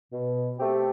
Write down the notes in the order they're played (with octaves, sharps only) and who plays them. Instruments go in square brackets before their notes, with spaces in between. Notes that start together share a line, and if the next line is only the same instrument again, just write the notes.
[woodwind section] B2
A3 C4 G4